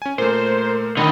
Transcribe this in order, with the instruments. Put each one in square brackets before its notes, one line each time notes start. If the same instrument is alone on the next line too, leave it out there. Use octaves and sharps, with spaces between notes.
[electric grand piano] C#4 G#5
[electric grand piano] A#2 A3 [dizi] A#4 [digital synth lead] C5
[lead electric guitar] D3 D#3 [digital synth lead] D#5 [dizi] B5